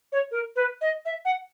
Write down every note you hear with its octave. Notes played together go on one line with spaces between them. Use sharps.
C#5
A#4
B4
D#5
E5
F#5